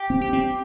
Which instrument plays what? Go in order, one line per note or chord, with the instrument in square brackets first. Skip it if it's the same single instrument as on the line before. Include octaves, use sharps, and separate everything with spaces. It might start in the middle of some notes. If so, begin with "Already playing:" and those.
Already playing: [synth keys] G4
[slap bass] C4
[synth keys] G4
[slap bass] C4